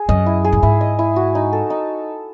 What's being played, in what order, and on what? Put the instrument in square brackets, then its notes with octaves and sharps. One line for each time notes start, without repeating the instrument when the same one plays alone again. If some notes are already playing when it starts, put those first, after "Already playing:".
Already playing: [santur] G#4
[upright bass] F#2 [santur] D#5
[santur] E4
G#4
[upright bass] A2
[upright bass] G#2 [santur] E4
[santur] D#5
E4
F#4
D#4
A4
D#4